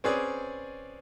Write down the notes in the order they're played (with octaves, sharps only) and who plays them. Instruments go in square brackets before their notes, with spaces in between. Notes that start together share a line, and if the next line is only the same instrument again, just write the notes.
[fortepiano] C4 C#4 G#4 B4 D5